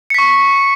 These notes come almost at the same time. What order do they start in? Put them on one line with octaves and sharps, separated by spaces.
C#7 B6 C#6